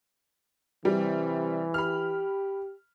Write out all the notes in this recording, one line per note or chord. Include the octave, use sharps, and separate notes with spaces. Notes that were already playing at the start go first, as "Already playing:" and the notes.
C3 E3 G3
G4 B5 F6